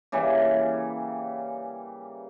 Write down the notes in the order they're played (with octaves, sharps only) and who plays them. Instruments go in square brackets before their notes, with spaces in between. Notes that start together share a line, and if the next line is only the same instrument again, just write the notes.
[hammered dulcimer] C#3 E3 G3 A#3